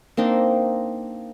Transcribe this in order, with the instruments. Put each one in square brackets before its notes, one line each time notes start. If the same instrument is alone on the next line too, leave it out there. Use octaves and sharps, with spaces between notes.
[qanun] A#3 C4 D4 D#4